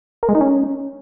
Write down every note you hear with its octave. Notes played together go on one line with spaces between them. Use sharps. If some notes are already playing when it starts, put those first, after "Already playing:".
A#4
G#3
D#4
C#4